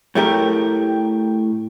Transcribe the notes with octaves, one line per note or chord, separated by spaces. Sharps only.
A2 A3 G4 A#4